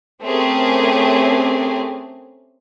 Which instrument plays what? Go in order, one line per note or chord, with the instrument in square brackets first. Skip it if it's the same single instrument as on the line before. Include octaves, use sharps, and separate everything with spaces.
[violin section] A3 C4 C#4 G4 G#4 A#4